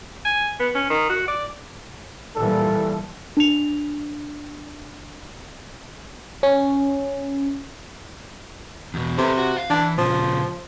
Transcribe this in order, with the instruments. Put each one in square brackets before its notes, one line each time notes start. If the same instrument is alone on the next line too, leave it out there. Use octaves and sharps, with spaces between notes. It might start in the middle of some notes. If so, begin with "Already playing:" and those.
[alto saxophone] G#5
B3
C#4
D#3
F#4
D5
[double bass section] A#2 E3 G3 [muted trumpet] A4
[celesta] D4 F7
[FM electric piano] C#4
[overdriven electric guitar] E2 B2
[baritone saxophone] C3 [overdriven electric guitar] A4 B4
[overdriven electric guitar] F#4
F5
[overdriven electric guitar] E3 [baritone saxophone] D4
[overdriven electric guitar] A#2 C#3 [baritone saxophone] F3